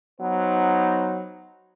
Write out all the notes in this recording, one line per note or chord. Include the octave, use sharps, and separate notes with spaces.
F#3 B3 D#4 C5